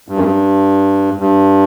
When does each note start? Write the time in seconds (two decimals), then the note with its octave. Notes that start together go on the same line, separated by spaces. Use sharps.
0.08 G2
0.17 F#2
0.24 G2
1.20 G2